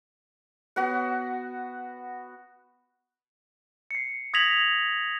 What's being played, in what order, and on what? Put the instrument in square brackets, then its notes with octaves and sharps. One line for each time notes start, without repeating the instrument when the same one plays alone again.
[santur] B3 F#4 B4 F#5
[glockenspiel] C7 C#7
D#6 G#6 A#6 B6 F7 F#7